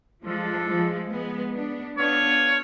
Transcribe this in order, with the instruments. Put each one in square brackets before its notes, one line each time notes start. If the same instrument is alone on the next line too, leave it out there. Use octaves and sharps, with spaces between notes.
[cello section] F3 G#3 [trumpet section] D4 F4 A4
[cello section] F3 G#3
G#3 B3
B3 D4
[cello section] B3 D4 [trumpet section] F4 A4 C#5